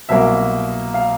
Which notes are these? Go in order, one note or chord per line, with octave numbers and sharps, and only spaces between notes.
C2 B2 F#3 A#3 E5
F5